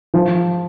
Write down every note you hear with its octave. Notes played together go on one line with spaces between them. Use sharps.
F3